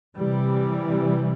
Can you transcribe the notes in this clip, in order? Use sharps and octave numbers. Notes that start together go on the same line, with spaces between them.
C3 E3 G3